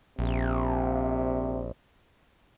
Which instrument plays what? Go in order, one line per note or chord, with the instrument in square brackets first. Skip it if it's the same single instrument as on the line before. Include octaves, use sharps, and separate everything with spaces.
[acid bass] A#1 [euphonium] C3